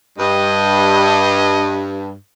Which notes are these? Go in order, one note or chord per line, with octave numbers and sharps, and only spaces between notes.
G2 D#5